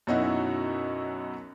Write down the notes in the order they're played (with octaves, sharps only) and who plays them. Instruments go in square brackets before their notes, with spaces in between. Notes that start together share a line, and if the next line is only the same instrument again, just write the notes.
[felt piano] F#2 B2 C#4 D#4 E4 F#4